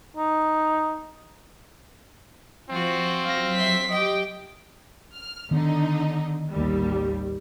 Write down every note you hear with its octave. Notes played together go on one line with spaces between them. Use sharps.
D#4
F3 C4 F4 F#4
F#3 F5 A#6
E5 C6 B6
G4 D#5 G5
F6
D3 D#3 B3 D4 D#4
A1 D#2 G3